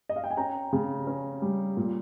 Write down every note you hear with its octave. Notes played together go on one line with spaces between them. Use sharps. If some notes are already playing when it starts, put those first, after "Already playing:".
D#5
F5
G5
G#5
C#4 G5 A#5
C#3
C#4
G3
A#2